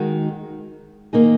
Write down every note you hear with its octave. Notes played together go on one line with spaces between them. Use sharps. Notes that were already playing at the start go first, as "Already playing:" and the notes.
Already playing: D#3 G#3 D#4 F#4
D#3 A#3 D#4 G#4